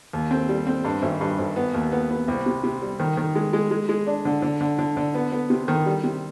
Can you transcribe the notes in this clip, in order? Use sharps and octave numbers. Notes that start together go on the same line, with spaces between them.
D#2
C4
G3
C4
G2
G#1
G2
G#1
B3
D#2
B3
B3
C2
C3
C3
G3
D#3
D#3
G#3
G#3
G#3
G#3
D4
D3
D3
D3
D3
D3
B3
B3
C3
D#3
G3
C3